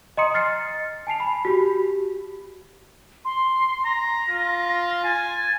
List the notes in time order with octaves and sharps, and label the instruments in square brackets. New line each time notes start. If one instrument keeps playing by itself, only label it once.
[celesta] D#5 G#5 A#5 C6 D#6 C#7
F6 A6 C7 C#7
G#5 A5 C7 F7
B5
F#4 G4
[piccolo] C6
[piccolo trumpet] A#5 [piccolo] A#6
[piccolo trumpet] F4
[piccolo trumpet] G#5 [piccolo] A6